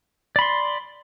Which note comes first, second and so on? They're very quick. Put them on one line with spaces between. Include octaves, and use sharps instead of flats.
D5 B5 C6